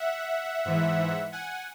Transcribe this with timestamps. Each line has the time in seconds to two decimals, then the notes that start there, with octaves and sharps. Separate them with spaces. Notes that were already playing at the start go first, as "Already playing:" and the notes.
Already playing: E5 F#5
0.65 G#2 E3
1.32 F#5 G#5